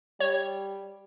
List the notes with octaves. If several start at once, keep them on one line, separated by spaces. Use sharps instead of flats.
G3 C#5